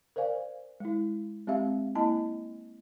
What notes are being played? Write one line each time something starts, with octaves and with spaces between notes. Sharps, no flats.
A#4 C5 D5 F5 G#5
G#3 E4
G#3 C4 G4 E5 F5
A#3 E4 D#5 G#5 A5